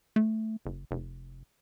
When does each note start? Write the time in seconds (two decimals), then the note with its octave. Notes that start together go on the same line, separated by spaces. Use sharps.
0.16 A3
0.66 F#1
0.91 F1